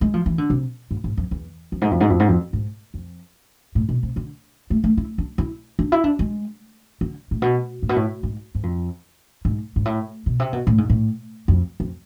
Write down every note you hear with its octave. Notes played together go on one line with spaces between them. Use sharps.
G#3
F3
E3
D3
C3
G#2
G#2
F2
E2
F2
G#2
F2
G#2
F2
G#2
F2
G#2
F2
A2
B2
C3
D3
A3
A3
E4
D4
E4
D4
E4
D4
G#3
D3
A2
B2
A2
B2
A2
G#2
G#2
F2
G#2
G#2
A2
B2
C3
B2
A2
G#2
A2
F2
F2